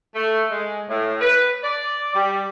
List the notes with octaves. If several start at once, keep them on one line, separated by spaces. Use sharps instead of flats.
A3
G#3
A2
B4
D5
G3